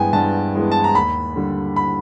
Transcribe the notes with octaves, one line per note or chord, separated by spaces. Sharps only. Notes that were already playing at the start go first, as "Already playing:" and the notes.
Already playing: G2 E3 G#3 B3 G5 G#5
G2 A5
E3 G#3 B3
A5
A#5
D#2 B5
D3 G3
B5